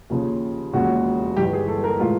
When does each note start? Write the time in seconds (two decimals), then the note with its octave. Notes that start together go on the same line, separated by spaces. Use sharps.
0.10 D#2 C#3 F3
0.73 E1 D#2 C#3 F3 F#4
1.36 G1 G2 E3 G4
1.53 G#4
1.68 A4
1.84 A#4
2.00 A2 E3 G#3 F4